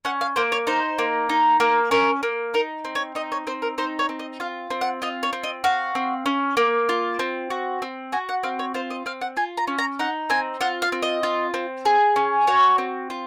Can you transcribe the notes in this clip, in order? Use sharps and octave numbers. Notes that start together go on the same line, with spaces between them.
C#4 F#5
F5
A#3 C5
C#5
D#4 C5
A#3
D#4
A#3
C#4 A#4
A#3
D#4 A#4
C4
C#5
D#4 D#5
C#5
C4 C5
A#4
D#4 C5
C#5
C4
D#5
F4 F5
C4
F#5
F4 D#5
C#5
C4
D#5
F#4 F5
C4
C#4
A#3
F4
C4
F#4
C4
F#4 G#5
F#5
C4 F5
C#5
F4 C5
D#5
C4 F5
F#5
F4 G#5
A#5
C#4
A#5
D#4 F#5
C4 G#5
F4 F#5
F5
C4
D#5
F4
C4
G#4
C#4
F#4 C#5
C4
F4